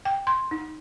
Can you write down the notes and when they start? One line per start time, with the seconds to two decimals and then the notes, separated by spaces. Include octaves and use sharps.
0.05 G5
0.27 C6
0.51 D#4